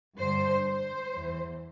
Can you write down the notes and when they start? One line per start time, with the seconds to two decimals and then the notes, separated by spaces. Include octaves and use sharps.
0.17 G2 D3 C5
0.66 C5
1.13 E2 E3